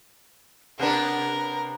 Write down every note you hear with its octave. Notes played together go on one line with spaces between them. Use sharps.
C3 B3 D4 A#4